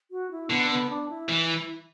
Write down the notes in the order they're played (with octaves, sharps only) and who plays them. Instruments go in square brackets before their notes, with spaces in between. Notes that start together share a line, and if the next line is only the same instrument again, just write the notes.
[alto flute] F#4
E4
[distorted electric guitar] D3 [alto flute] B3
[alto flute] B3
D4
E4
[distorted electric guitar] E3